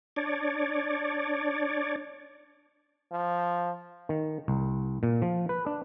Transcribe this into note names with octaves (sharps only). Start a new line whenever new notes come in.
D4 C#5 D5
F3
D#3
C2
A#2
F3
B4
D4